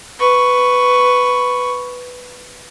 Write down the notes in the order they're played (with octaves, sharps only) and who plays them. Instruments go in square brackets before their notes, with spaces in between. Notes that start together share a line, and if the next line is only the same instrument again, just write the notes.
[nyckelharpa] B4 C#6